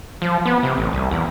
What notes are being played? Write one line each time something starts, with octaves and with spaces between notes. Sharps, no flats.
F3
B3
C3
A1
C2
E2